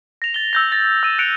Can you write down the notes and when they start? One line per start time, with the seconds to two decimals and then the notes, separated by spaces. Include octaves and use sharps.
0.22 A#6 F7
0.34 A6 G7
0.53 E6 G6 A#6
0.72 A6 A#6
1.03 E6 D#7 E7
1.18 F#6 A6 C#7 D7 F7